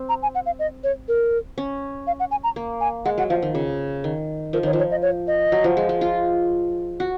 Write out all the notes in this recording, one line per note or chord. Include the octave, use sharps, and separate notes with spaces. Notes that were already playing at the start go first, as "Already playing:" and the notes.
Already playing: C4
A#5
G#5
F#5
F5
D#5
C#5
A#4
C#4
F5
F#5
G#5
A#5
A#3
G#5
G#3 F#5
F#3 F#5
F3 F5
D#3
C#3
D#3
F3 A#4
D#3 C#5
F3
C#5
D#5
C#5
D#5
F#3
F3
G#3
G#3
F4
F#4